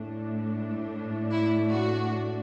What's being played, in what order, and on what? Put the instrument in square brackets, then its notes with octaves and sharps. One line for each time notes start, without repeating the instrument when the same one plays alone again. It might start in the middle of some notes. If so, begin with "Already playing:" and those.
Already playing: [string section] A2 A3 D4
E4
F#4